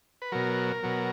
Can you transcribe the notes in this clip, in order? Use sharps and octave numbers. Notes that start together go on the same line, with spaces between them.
B4
B2 F#3 A#4
B2 F#3